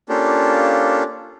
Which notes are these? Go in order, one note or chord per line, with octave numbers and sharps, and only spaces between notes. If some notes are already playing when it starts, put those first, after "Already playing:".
A#3 C#4 D4 F4 G4 A4